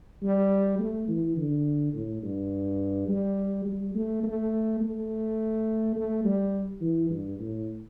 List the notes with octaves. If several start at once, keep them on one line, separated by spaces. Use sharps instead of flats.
G3
A3
E3
D3
A2
G2
G3
G3
A3
A3
A3
A3
G3
E3
G2
A2